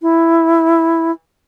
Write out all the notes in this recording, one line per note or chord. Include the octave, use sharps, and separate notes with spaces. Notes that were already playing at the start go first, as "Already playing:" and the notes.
E4